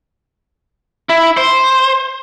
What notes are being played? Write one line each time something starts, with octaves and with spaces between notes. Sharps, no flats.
E4
C5